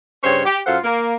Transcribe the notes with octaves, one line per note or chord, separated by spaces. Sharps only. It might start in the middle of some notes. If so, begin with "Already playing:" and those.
G2 C#3 C5 C#5
G4
F#2 F4 A4 C5 F5 F#5
A#3